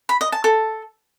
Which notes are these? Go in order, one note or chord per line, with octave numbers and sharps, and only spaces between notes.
B5
D#5
A5
A4